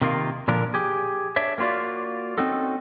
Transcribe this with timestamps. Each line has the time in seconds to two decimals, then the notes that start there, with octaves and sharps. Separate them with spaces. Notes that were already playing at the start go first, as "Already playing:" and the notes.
0.01 C3 D#3 A#3 F4
0.48 A#2 D3 F3 D4 A#4
0.74 G4 G#4
1.36 D4 C#5 E5
1.58 A#3 C4 F4 F#4 D5
2.38 C4 C#4 D#4 F#4 A4